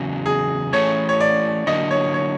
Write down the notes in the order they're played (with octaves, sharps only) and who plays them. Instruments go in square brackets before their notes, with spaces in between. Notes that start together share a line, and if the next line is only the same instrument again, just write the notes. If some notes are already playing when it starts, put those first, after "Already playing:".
Already playing: [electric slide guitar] E2 C#3 F#3
[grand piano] G#4
[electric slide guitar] E3 A3 C#4 [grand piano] C#5
[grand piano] C#5
D5
[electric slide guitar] D3 F#3 A#3 [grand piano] D#5
[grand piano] C#5
C#5